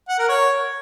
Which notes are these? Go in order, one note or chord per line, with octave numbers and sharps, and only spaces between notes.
F#5
A#4
C#5